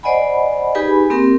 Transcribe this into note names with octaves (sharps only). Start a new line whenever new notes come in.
C5 D5 D#5 F#5 G#5 B5
D#4 G4 G#4 B4 G#5 B5
A#3 C4 G4 A#4